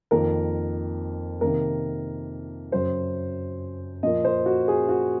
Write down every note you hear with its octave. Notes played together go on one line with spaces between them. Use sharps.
F2 D#3 A#3 A#4
C3 D#3 A#3 A#4
F#2 C#3 F#3 C5
A#2 F3 A#3 D#5
C5
F#4
G#4
F#4